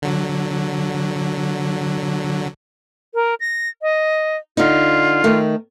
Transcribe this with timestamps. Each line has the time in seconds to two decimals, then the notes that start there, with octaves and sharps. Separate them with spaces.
0.02 D3 F#3
3.15 A#4
3.40 A#6
3.82 D#5
4.57 D3 D#4 F4
5.24 D#3 A3